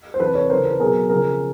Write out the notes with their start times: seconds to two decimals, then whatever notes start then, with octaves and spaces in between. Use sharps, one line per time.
0.14 C5
0.20 C3 E3 A4 B4
0.35 B4 C#5
0.50 C#3 E3 A#4 C5
0.65 A4 B4
0.79 B2 F#3 G#4 A#4
1.09 C#3 F3 G#4 A#4